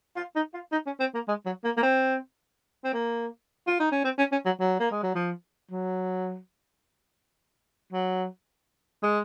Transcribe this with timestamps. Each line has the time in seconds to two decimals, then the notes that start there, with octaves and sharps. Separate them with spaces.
0.16 F4
0.35 D#4
0.54 F4
0.72 D#4
0.86 C#4
1.00 C4
1.14 A#3
1.28 G#3
1.46 F#3
1.64 A#3
1.77 A#3
1.83 C4
2.84 C4
2.93 A#3
3.67 F4
3.80 D#4
3.92 C#4
4.04 C4
4.18 C#4
4.32 C#4
4.45 F#3
4.60 F#3
4.80 A#3
4.91 G#3
5.03 F#3
5.15 F3
5.71 F#3
7.93 F#3
9.03 G#3